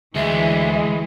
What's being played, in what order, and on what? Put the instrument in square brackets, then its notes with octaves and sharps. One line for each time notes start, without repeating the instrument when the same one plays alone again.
[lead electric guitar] D2 [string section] E3 [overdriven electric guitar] G#3 [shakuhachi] E5